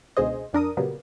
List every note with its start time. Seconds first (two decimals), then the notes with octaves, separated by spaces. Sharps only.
0.17 C#2 B2 D3 G#4 C5 D#5
0.53 F2 D4 A#4 D#6
0.77 A#2 C#3 F#3 G3 A#3 B3